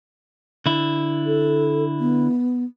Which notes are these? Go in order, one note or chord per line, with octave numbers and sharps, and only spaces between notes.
D3 E4
A4
B3